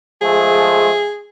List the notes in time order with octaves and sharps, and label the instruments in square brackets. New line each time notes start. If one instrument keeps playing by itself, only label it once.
[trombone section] F3 G#3 A3 [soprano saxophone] G#4